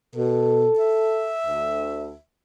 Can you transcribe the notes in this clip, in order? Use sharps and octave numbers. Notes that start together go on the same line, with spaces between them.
B2 A4
E5
D2